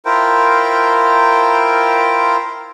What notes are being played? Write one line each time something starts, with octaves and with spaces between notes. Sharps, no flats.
E4 F4 A#4 C5 G5